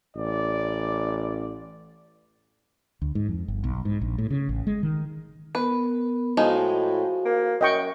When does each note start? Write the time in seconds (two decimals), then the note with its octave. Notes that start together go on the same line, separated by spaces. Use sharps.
0.16 A1 D5
3.02 D2
3.15 G#2
3.29 F2
3.48 G1
3.64 B1
3.85 G#2
4.01 A#1
4.18 A2
4.30 C#3
4.49 A1
4.67 G#3
4.83 D#3
5.55 B3 A#4 B4 B5
6.37 A2 F3 G#3 D#4 F#4 C5 F5
7.25 A#3
7.61 F#2 D#5 G5 C#6